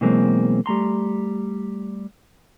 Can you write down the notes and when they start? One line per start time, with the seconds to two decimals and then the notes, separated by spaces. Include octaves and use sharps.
0.01 B2 E3 F#3 G#3 A#3 C4
0.66 G3 A3 A#5 C6